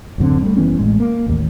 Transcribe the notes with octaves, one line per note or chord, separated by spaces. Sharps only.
D1 F#2 D3 C4
G3 A3
F#1 E3 B3 C#4
A1 A2 G#3
A#3
A1 D#2